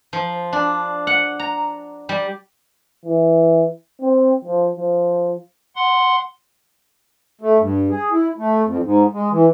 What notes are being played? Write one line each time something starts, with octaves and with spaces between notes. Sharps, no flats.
F3
D4
F#5
A#5
G3
E3
C4
F3
F3
F#5 C6
A3
G2
G#4
E4
A3
F2
G#2
G#3
E3